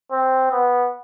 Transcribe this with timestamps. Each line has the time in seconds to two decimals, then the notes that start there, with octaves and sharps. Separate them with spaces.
0.12 C4
0.52 B3